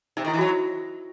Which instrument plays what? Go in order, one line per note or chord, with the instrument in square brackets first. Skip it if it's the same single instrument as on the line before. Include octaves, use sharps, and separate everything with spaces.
[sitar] C3 [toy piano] D#4
[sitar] D#3 [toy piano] E4
[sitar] E3
[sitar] F#3 [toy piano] F#4